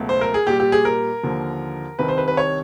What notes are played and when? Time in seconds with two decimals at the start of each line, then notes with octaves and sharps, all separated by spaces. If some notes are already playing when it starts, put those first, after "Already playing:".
Already playing: C#2 B2 F#3 A3
0.09 C5
0.21 A#4
0.34 G#4
0.47 A#2 G3 G4
0.60 G4
0.72 G#4
0.85 A#4
1.23 D#2 D3 F3
1.99 C2 C3 D#3 G3 B4
2.09 C5
2.18 B4
2.28 B4
2.37 C#5